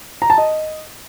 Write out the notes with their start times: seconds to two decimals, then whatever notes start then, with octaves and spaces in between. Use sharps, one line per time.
0.22 A#5
0.30 A5
0.38 D#5